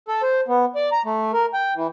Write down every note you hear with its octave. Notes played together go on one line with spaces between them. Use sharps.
A4
C5
B3
D5
A#5
A3
A#4
G5
E3